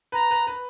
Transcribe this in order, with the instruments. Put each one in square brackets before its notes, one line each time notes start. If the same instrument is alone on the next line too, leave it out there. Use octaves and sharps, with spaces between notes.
[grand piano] B4 [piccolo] A#5
[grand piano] B4
B4